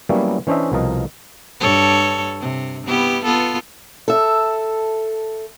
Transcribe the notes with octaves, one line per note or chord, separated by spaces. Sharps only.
F#3 G3 A#3 B3 C#4 E4
E3 C#4 D4 C5 D#5 E5
C2 B2 F3 A#4 D#5
G2 A4 C#5
C3
B3 E4 G4
B3 F4 A4
A4 E5